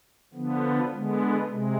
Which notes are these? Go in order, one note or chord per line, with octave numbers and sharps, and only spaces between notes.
D3 F3 B3
D3 G#3 B3
C3 G#3